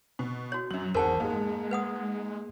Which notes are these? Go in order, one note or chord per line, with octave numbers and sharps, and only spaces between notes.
B2
F#4 C#5
F#2 F#3 F#7
G#1 E2 G#4 A#4 C5 F#5 A5 E6
G#2 G#3 A#3 G#4
B4 F#5 D#6